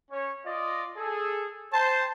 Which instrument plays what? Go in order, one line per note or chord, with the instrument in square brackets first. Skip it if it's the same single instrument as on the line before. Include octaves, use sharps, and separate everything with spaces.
[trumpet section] C#4 C#5
F4 D5 D#5
G#4 A4
[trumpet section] C5 [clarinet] A5